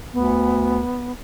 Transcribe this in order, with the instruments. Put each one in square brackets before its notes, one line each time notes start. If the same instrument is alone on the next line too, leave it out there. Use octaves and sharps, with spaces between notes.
[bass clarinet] D2 [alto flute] B3